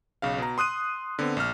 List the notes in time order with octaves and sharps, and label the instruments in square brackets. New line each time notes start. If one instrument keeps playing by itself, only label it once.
[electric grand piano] B1 C#3 F5
B2 A#5
C6 D#6 F#6 D#7
D3 B3 C4
A#1 F6